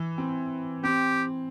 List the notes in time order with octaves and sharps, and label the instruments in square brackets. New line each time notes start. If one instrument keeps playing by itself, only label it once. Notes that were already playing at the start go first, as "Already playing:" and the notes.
Already playing: [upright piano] E3
C4
[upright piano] C4 [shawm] G4